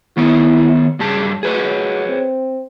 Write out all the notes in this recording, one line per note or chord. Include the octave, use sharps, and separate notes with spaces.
D#3 B3 E4 C#5
G2 C#3 F#3 A5
F#3 G#4 B4 C#5
C4